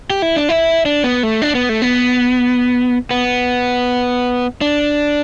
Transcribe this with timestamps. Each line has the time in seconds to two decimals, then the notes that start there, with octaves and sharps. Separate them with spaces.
0.10 G4
0.22 E4
0.36 D4
0.49 E4
0.85 D4
1.04 B3
1.23 A3
1.42 D4
1.55 B3
1.69 A3
1.82 B3
3.11 B3
4.61 D4